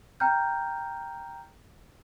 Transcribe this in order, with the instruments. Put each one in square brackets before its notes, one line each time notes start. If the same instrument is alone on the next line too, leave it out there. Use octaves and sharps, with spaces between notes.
[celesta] G5 A#5 F6 G6